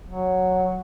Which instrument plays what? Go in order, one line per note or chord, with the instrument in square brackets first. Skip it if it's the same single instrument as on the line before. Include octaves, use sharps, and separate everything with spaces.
[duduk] F#3